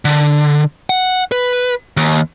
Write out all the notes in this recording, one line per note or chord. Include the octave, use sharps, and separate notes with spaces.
D3
F#5
B4
D#2